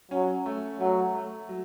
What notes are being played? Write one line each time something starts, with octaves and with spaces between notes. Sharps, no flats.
F#3 C#4
A3
F#3 A3
A3
F#3